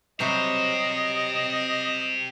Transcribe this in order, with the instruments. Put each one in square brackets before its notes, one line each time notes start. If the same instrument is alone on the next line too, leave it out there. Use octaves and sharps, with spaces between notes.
[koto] C3 F#3 G3 [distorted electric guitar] G4 C5 [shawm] D#5